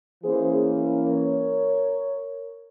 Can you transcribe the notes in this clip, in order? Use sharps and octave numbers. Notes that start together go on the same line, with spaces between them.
E3 A#3 C#4 G#4 C5
A#4 C#5